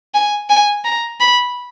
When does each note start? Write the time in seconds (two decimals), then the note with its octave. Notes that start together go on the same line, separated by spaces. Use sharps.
0.14 G#5
0.50 G#5
0.85 A#5
1.20 B5